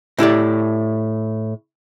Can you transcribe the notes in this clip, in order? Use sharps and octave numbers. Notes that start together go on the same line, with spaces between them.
A2 E4 G4 D5